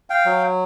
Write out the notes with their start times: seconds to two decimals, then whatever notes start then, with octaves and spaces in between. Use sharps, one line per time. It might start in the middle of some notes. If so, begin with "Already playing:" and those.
0.10 F5 G5
0.26 F#3